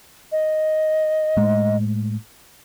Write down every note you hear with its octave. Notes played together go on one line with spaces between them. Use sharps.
D#5
A2 G#3 A3